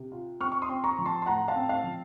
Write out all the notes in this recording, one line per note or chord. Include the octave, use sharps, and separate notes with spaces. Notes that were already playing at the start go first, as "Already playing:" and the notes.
Already playing: C3
F4
C4 C#6 F6
C#6
C6 D#6
C4
A#5 C#6
F3
A5 C6
C6
A2 F#5 A#5
F5 A5
C4
F5 A5
F3